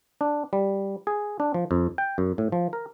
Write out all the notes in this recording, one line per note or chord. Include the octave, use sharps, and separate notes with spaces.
D4
G3
G#4
D4
F3
F2
G5
F#2
A2
F3
A#4